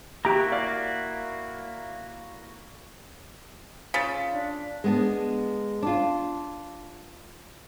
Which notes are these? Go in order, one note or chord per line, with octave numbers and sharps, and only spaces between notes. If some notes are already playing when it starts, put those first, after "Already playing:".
A#3 E4 F#4 G4 A#5
D5 F5
C#3 F4 A6 B6
D4
G#3 B3 D4
D4 F4